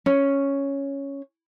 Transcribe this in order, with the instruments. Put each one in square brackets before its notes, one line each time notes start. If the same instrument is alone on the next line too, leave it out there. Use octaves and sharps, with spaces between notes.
[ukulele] C#4